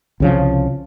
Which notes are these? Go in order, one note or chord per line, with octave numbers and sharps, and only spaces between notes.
C2 C#3 F3